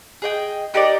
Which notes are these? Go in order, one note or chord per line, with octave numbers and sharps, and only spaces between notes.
G#4 D#5 G5
D#4 G4 A#4 D5